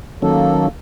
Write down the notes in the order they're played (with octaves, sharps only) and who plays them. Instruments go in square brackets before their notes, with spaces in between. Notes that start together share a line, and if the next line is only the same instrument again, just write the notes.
[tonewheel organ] D#3 F#3 C#4 [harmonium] A#3 A4